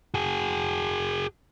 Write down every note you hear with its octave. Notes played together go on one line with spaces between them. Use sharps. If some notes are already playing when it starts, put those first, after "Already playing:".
F#4 G#4